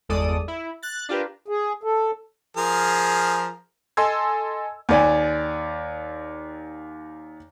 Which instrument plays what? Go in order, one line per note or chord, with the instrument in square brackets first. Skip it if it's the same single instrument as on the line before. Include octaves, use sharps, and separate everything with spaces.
[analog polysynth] G1 E2 G#3 A4 D5 D#6
E4
F#6 A6
D4 F4 G4 A#4 B4
[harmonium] G#4
A4
[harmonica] F3 G#4 A#4
[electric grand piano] A4 D#5 G#5 C6 E6 G#6
[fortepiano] D#2 D5 G#5